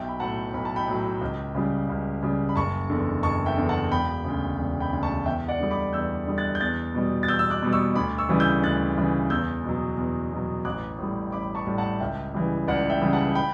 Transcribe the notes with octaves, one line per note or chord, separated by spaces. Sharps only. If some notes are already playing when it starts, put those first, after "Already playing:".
Already playing: B1 E5 G5
B5
A2 F#3 F#5 A5
B1 B5
A5
G5 B5
A2 F#3
C#2
C#3 G3
C#2
C#3 G3
B5
F#1 A5 C#6
E2 D3
F#1 A5 C#6
E5 G5
E2 D3
F#5 A5
E1 G5 B5
D2 C#3
E1
G5 B5
D2 C#3
A5 C#6
E2 E5 G5
D5 F#5
D3 G3
B5 D6
E2 E6 G6
D3 G3
F#6 A6
G6
E2 F#6 A6
B2 G3
A6
E2 E6 G6
E6
D6 F#6
B2 G3
C#6 E6
D2 B5 D6
C#6 E6
C#3 E3 G3
E6 G6
D2 F#6 A6
C#3 E3 G3
E2 E6 G6
B2 F#3
E2
B2 F#3
A1 D6 F#6
A2 G3
A1 B5 D6
A5 C#6
A2 G3
F#5 A5
C#2 E5 G5
C#3 E3 G3
C#2 D5 F#5
E5 G5
C#3 E3 G3
F#5 A5
G5 B5